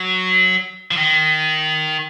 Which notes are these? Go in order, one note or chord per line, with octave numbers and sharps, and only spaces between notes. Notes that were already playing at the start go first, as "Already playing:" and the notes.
Already playing: F#3
F3
D#3